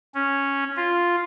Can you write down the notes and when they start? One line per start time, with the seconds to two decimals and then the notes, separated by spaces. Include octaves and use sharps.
0.15 C#4
0.77 F4